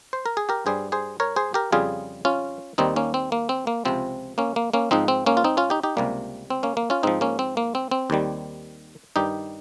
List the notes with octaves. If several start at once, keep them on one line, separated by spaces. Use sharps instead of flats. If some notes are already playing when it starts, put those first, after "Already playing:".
C5
A#4
G#4
G4 A#4
G2 G3 G#4 C5
G#4 C5
A#4 C#5
G#4 C5
G4 A#4
F2 C#3 G3 F4 G#4
C#4 F4
D#2 D#3 G3 C4 D#4
A#3 C#4
C4
A#3
C4
A#3
C#2 C3 F3 C4
A#3 C#4
A#3
A#3 C#4
G#2 F3 C4 D#4
C4
A#3 C#4
F4
C4 D#4
C#4 F4
D#4 G4
D#4 G4
C#2 C3 G3 A#3
C4
A#3 C#4
A#3
C#4 F4
G#2 F3 C4 D#4
A#3 C#4
C4
A#3
C4
C4
D#2 D#3 G3
G2 D#3 G3 D#4 G4